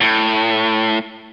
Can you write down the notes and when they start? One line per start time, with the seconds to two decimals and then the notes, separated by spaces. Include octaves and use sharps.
0.01 A2